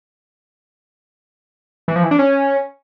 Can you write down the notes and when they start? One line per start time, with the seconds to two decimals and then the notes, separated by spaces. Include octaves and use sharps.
1.88 E3
1.96 F3
2.03 E3
2.11 D4
2.19 C#4